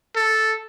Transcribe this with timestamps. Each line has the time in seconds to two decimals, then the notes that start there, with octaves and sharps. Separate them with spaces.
0.16 A4